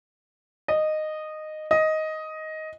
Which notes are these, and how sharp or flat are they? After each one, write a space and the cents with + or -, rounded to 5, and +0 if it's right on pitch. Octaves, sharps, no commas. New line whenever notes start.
D#5 -10
D#5 +10